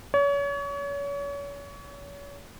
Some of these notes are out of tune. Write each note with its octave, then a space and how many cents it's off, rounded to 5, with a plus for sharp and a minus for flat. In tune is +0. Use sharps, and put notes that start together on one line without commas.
C#5 +35